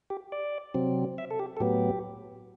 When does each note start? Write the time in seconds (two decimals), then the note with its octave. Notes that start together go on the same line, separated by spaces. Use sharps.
0.10 G4
0.32 D5
0.74 C3 F#3 C4
1.18 E5
1.31 A4
1.39 G4
1.57 A4
1.60 A2 F#3 B3 G4